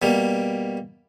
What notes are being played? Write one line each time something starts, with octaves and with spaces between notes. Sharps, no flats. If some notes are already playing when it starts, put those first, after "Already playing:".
B2 G3 A#3